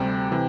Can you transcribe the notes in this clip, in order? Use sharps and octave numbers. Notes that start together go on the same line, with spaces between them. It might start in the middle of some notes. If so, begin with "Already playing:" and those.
Already playing: D2 C3 G3 G5
C3 E3